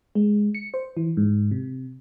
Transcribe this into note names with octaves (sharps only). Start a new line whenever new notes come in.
G#3
C#7
C5
E3
G#2
C3